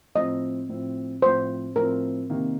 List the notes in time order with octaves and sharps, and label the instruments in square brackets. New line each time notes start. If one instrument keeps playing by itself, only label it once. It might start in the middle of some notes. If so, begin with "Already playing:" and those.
[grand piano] A2 F3 C4 [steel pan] D#5
[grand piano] A2 F3 C4
[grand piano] A2 F3 C4 [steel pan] C5
[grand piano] A2 F3 C4 [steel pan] A#4
[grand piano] C3 D#3 A#3 D#4